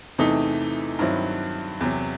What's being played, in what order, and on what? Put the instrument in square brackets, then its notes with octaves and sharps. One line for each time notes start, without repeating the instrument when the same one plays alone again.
[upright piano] E2 C3 E3 A3 D#4
G2 D#3 F#3 C4 E4
E2 C3 F#3